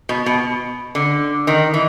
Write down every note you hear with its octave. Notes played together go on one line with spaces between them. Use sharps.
B2
B2
D3
D#3
E3